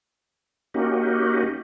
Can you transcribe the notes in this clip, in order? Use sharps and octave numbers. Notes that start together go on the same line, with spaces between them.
A#3 C#4 D#4 F#4 G4